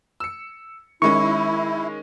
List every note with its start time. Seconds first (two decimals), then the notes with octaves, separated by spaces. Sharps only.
0.20 E6 C#7
1.02 D#3 G#3 C#4 E4 C#6